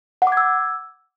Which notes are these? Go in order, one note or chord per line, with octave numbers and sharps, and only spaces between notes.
F#5
D6
G#6
E6